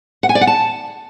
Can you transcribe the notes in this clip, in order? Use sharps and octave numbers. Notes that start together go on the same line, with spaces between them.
F#5
G#5
D5
F#5
A5